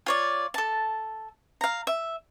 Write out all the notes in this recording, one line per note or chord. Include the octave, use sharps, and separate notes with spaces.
F4 C#5 D5
A4 A5
F5 A#5
E5